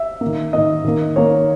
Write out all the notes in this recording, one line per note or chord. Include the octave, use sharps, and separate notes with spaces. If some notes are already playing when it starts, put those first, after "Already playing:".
Already playing: E5
A#3
D#3
D#3 A#3 D#5
D#3 A#3
D#3 A#3 C#5